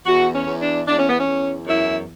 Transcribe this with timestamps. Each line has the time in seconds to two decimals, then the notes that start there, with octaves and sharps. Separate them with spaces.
0.06 E2 F#4
0.33 C#4
0.46 E2
0.60 D4
0.87 E2 D4
0.97 C#4
1.07 B3
1.18 C#4
1.27 E2
1.67 F#2 E4